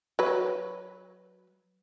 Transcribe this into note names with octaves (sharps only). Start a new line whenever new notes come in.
F#3 B4